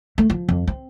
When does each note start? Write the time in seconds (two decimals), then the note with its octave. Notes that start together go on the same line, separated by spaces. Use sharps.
0.18 A3
0.30 F3
0.49 F2
0.68 C4